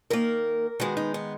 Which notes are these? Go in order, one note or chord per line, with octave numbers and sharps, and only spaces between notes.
D#3 A#3 A#4
D#3 G#3 B3 F#4
D#4
B3